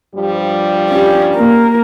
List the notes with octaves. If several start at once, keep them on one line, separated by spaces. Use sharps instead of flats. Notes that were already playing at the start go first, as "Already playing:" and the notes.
G2 F3 G3
C#4 G4
A#3 A#4